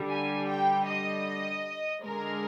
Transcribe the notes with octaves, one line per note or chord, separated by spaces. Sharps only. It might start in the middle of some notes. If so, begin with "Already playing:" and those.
Already playing: D3 G3
G#5
G5
D#5
D3 G#3 A#4